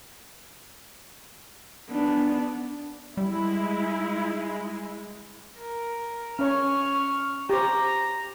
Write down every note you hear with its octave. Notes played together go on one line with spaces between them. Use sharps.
B3 D4
G3 G#3 E4
A#4
C#4 C#5 C#6 F6
G4 C5 A#5